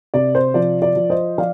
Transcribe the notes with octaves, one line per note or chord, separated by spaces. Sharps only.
C3 D5
C5
F3 D5
D5
F3
C5 D#5
F3 D5 F5